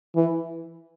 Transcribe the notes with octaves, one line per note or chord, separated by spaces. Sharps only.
E3